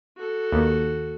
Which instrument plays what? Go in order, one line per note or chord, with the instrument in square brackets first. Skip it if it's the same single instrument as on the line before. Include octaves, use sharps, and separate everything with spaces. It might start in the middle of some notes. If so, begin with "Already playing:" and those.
[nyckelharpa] F#4 A4
[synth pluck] D#2